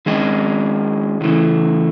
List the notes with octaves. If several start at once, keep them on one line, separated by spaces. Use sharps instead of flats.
D#3 G#3 C#4 G#4 D#5
C#3 E3 A3